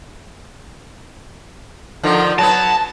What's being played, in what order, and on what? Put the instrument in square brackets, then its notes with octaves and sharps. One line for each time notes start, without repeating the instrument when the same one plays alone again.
[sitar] D3 D#3 F3
[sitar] F#3 B3 [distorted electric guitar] A5